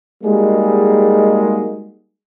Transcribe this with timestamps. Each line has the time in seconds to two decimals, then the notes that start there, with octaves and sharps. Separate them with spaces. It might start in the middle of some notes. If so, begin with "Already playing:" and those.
0.24 G3 G#3 A#3 D#4 F#4 G#4